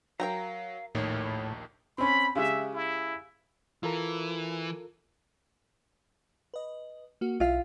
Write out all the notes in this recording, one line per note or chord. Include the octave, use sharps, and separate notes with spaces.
F#3 A#4 F5 G5 A#5
A#1 D#2 A2 D#3 C#5
C4 C#4 B5
C#3 G#3 G4 E5
E4
E3 F4 A4 A#4
B4 D#5
A#3 F#4
B1 E4 F4 E5 F5